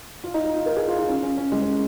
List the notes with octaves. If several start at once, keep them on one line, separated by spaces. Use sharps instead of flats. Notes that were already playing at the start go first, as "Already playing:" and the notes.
F4
D#4
D#4
F4
A#4
G#4
F4
D#4
C#4
C#4
C#4
G#3
C#4